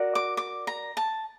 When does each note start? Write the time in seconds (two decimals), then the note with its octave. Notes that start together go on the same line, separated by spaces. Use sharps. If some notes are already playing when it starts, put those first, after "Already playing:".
Already playing: F#4 A#4 D5
0.15 D6
0.37 D6
0.67 A#5
0.97 A5